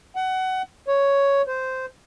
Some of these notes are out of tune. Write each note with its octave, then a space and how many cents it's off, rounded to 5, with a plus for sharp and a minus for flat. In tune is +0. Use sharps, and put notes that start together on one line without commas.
F#5 +20
C#5 +5
C5 -10